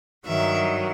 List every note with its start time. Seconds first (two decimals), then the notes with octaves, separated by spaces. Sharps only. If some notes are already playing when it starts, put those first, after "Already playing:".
0.26 G2 D#3 F#3 E5